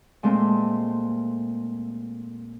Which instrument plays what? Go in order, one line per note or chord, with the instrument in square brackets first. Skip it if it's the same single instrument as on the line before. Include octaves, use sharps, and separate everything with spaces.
[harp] A#2 G#3 A3 C4